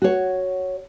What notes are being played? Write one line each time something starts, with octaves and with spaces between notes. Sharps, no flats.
F#4 C#5